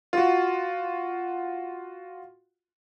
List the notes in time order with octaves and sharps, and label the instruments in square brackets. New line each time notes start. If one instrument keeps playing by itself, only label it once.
[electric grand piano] F4 F#4